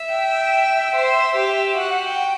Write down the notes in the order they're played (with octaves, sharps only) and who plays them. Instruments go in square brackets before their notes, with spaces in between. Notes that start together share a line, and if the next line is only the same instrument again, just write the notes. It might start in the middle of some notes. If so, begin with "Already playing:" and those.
Already playing: [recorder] E5
[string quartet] G5
C5
G4
[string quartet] F#4 [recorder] F#5
[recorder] G5